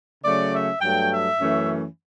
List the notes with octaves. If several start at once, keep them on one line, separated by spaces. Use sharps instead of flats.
C#3 F#3 A3 C#4 D5
E5
G2 F#3 A3 G5
E5
F#2 E3 A3 C#4